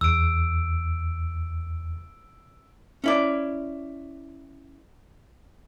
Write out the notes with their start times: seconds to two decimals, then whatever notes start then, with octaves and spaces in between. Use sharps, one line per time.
0.01 E2 E6 D7
3.04 C#4 E4 D5